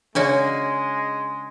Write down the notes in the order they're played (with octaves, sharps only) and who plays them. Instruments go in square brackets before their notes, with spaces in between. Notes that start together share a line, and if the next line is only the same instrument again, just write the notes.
[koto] C#3 C#4 F#4 [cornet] G#3 [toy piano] D4 C#5 D5